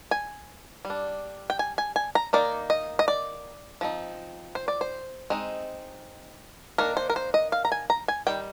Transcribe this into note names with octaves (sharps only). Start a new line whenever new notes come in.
G#5
G3
D4
G5
G#5
G#5
G#5
A#5
D#3 A#3 D#4 D5
D#5
D#5
D5
F3 C4 D#4
C5
D5
C5
G#3 C4 D#4
D#3 A#3 D4 A#4
C5
A#4
C5
D#5
F5
A#5
G#5
A#5
G#5
D#3 G3 G5